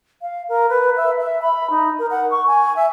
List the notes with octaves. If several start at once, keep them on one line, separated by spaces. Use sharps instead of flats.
F5
A#4
B4
E5
E5
B5
D#4
A#4
F#5
C#6
G#5
E5